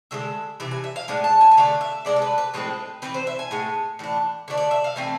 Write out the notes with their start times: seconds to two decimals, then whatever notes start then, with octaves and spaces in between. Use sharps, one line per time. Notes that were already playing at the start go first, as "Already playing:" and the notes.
0.11 D3 F3 G#3 E5
0.60 C3 E3 E5
0.71 G#5
0.84 E5
0.96 F5
1.08 A2 G#3 D4 G#5
1.24 A5
1.41 G#5
1.51 G#5
1.57 D3 A3 D4 F5
1.81 E5
2.05 C3 G#3 D4 D5
2.16 A4
2.22 B4
2.38 B4
2.54 A2 F3 G#3 C4 B4
3.02 E3 G#3 C4 B4
3.14 C5
3.27 E5
3.39 G#5
3.51 A2 G#3 B3
3.99 A2 E3 D4
4.48 D3 A3 D4
4.57 D5
4.71 E5
4.84 F5
4.96 E3 A3 C4 G#5